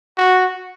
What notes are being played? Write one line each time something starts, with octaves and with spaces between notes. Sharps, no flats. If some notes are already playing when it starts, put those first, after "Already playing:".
F#4